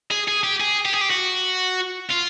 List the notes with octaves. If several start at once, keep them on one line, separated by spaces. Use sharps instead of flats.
G#4
G#4
G4
G#4
G4
G#4
G4
F#4
F4